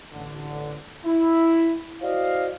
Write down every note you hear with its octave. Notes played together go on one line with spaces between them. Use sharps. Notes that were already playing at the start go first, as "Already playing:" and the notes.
A1 D3
E4
E4 F#4 C5 D5 D#5 F5